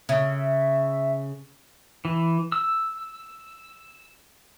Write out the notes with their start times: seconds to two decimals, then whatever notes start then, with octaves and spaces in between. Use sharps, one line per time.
0.09 C#3 E5
2.05 E3
2.52 E6